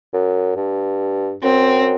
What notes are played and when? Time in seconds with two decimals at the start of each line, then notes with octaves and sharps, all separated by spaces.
0.14 F#2
0.56 G2
1.43 F#2 C4